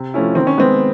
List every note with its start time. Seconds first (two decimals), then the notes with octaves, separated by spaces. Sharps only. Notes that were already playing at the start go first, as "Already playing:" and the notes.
Already playing: C3
0.14 F3 A3 C#4 E4
0.35 D#3 C4
0.47 C#4
0.58 G#3 B3 C4